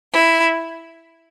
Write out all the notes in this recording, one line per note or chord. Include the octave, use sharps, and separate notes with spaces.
E4